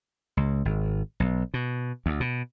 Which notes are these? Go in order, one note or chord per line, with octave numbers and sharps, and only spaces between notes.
C#2
G#1
B1
B2
D2
B2